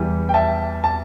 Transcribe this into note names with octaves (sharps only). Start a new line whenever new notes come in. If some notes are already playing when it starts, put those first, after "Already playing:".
Already playing: E2 E3 G3
G5
E5 A5
A5